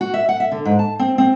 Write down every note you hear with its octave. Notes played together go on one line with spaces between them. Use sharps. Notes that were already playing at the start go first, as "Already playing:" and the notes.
F#4
E5
F#5
E5
D3
G#2
A5
C4
C4